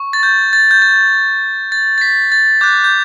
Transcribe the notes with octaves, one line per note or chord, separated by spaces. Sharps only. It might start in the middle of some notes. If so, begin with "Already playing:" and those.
Already playing: C#6
A6
G6
A6
G6
A6
A6
A6
B6
A6
D6 F#6 G6
G6